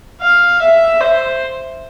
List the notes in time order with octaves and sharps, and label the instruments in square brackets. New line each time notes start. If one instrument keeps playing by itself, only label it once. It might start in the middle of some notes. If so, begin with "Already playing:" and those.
[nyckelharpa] F5
E5
C5